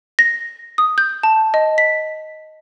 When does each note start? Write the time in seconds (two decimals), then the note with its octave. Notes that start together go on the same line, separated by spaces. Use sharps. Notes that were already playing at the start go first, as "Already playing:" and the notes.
0.19 A#6
0.78 D#6
0.98 G6
1.23 A5
1.54 D#5
1.78 B6